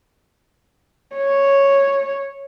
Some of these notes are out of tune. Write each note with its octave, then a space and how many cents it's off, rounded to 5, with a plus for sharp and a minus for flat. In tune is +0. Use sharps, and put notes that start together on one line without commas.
C#5 -5